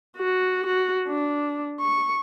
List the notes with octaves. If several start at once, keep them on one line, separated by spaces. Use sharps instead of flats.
F#4
F#4
D4
C#6